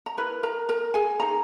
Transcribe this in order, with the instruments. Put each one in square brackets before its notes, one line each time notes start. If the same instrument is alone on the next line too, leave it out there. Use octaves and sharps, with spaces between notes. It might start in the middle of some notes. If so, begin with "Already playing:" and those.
[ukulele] A#5
E4 A#4 B4 B5
A#4 A#5
A#4 A#5
G#4 G#5
D#4 G#4 A#5